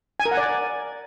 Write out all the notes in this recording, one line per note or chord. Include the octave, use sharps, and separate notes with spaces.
G#5
A#4
F#5
D5